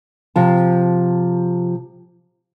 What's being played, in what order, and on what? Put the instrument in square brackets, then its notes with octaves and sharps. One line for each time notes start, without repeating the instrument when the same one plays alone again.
[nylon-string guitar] C3 F3 A5